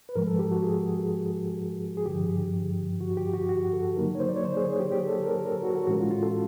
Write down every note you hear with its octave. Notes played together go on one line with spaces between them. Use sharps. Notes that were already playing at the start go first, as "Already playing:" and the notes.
B4
G#2 F3 G#3 A#4
A4
G4
F#4
G#4
G#4
G2 D3 F3 G4
F#4
G4
F#4
F#4
A4
D3 F#3 A#3 D#4 A#4
C#5
C5
D5
C#5
C5
G#4
G#4
G4
G4
A4
A#4
A#4
A4
F#4
F#4
A2 E3 G#3 C#4 E4 F#4
F4
F4
A4